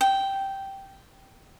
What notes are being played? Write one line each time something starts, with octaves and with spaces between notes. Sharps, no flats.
G5